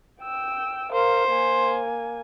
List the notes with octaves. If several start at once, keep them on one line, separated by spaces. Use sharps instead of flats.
G5 E6
A#4 C5 F5
A#3 G#5